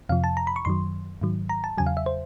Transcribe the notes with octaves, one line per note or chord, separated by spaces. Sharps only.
F2 C3 F3 F5
A5
A#5
B5
C#6
F#2 D#3 F#3 C6
G#2 D#3 F#3
A#5
A5
E2 C#3 F#3 G#5
F5
E5
C5